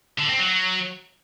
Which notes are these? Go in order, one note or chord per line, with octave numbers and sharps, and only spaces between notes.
D3
C4
F#3